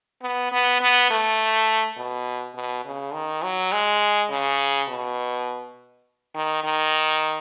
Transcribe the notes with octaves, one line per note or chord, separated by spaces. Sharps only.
B3
B3
B3
A3
B2
B2
C#3
D#3
F#3
G#3
C#3
B2
D#3
D#3